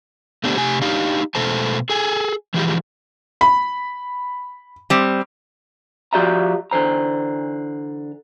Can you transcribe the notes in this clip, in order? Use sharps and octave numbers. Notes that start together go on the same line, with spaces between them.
A3 B3 D4 G4 C5
C3 A3 G4 G#5
D4 D#4 G4 F5
B2 A3 A4 C5 A5
G#4 A4 G#5
E3 F3 G#3 G4
B5
G3 C4
F3 F#4 G4 D5 E5 A#5
D3 E3 C5 A#5